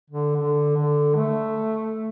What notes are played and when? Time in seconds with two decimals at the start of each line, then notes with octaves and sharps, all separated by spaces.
0.10 D3
0.37 D3
0.76 D3
1.16 A3